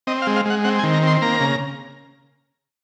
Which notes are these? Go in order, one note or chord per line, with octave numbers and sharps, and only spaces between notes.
C4 D#5
F5
G#3
F5
G#3 F#5
C4 F#5
G#5
D#3
A#5
C4
C6
A#3 A#5
C#3